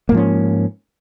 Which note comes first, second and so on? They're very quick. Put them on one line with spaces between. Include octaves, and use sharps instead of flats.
A#3 G#2 F3 C#4